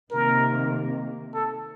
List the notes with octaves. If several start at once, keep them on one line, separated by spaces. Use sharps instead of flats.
C3 D#3 A#3 A#4
A4